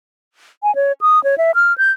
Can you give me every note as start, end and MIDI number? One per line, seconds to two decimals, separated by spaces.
0.63 0.74 80
0.75 0.92 73
1.01 1.22 87
1.24 1.38 73
1.38 1.51 76
1.55 1.76 89
1.78 1.92 91